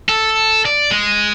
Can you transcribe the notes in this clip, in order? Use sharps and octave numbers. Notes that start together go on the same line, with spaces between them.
A4
D5
G#3